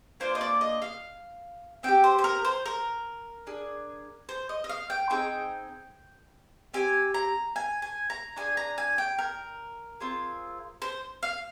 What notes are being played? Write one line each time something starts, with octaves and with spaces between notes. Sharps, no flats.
A#3 D4 F4 C5
D#5
D5
D#5
F5
C4 D#4 G5
G4
C5
C5
A#4
C5
A#4
D4 G#4
C5
D#5
D#5
F5
G5
C4 D#4 G#4 G5
C4 G4 G#5
A#5
G#5
G#5
A#5
D4 F4 G#4 G#5
A#5
G#5
G5
A#4
C4 F4 G#4
C5
F5